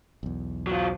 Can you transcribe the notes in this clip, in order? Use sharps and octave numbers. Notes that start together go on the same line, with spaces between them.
B1 E2
F#3 F4